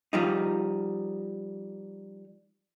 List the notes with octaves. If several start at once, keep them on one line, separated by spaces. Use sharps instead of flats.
F3 G3 D#4